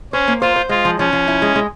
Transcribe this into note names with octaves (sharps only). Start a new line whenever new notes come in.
C#4 C5
A#3
F4 C5
C5
G#3 F4
F3
F3 C#4
F3
E4
G#3
G#3